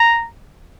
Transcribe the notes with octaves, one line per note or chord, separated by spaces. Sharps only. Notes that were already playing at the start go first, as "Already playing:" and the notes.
Already playing: A#5